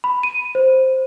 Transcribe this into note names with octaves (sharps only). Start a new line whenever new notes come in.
B5
D#7
C5